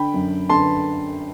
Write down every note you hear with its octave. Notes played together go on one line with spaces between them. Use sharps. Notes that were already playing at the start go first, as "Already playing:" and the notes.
Already playing: D3 G5 B5
F#2
D3 A5 C6